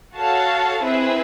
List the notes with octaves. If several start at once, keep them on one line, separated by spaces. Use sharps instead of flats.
F#4 A4 C#5 F5 A5
C4 E4 G#4 B4 E5